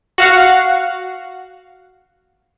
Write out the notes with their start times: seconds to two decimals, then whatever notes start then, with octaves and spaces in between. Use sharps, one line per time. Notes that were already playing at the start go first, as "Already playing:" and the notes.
0.18 F#4 F5 F#5